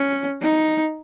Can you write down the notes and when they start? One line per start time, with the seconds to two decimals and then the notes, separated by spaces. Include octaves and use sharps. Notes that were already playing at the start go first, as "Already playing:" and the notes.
Already playing: C#4
0.42 D#4